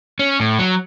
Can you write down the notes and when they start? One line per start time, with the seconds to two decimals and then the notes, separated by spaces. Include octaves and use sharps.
0.19 C#4
0.40 A2
0.59 F#3